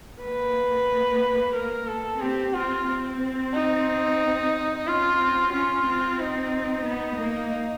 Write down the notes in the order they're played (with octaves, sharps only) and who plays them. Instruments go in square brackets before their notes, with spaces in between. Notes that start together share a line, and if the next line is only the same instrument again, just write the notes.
[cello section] A#3 [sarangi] B4
[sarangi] A#4
A4
[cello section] C4 [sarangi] G4
[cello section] C4 [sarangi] F4
[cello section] C4
[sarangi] D#4
[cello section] C#4 [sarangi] F4
[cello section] C4
[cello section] C#4 [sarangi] F4
[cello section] C4
[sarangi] D#4
[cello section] B3
A#3